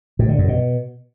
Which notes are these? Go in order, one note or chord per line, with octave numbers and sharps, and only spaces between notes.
A2
D3
F#2
B2